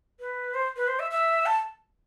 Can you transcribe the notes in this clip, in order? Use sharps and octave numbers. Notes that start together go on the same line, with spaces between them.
B4
C5
B4
C5
E5
E5
A5